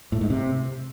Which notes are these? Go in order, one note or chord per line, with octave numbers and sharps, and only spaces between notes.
A2
G#2
C3